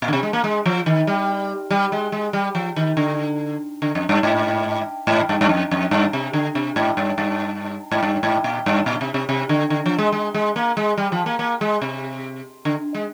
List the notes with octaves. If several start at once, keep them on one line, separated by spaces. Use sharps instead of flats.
A#2
D3
C3
G#3
A#3
G#3
F3
D#3
G3
G3
G#3
G#3
G3
F3
D#3
D3
D3
F2
G2
G#2
G#2
G2
G2
F2
F2
G2
C3
D3
C3
G#2
G2
G2
G#2
G2
G#2
A#2
G2
A#2
C3
C3
C3
D3
D3
F3
G#3
G#3
G#3
A#3
G#3
G3
F3
A#3
A#3
G#3
C3
D3
G#3